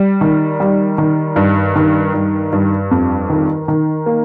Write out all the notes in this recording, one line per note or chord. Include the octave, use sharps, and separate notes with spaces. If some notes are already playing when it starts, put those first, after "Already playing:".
Already playing: G3
D#3
G3
D#3
G2
D#3
G2
G2
F2
D#3
D#3
A#3